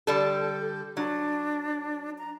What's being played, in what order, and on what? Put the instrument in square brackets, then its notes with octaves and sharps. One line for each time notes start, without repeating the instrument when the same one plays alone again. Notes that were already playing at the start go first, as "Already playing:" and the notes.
[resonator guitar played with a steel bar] D3 G3 A4
[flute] G6
[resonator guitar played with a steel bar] F#3 [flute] D4
[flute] A#5